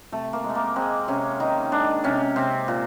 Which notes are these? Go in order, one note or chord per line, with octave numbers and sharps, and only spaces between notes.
C3 A3
A#3
G#3
A3
A#3
G#3 C4
C3 C#4
D#3 D#4
G#3 D4
C3 C#4
C3 C4
A#2